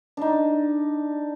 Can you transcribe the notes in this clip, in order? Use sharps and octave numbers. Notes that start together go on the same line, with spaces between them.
D4 D#4